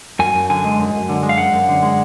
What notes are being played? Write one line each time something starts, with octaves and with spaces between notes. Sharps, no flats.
F#2 G#5
F#2
D3 G#5
G#3
F#2
F#2
D3
G#3
F5
F#2 F#5
F#2
D3
G#3